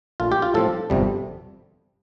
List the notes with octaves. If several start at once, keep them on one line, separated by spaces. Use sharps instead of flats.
A#1 A#2 A3 F4
G4
F4
A2 F3 C4 A4
G1 F2 C3 G3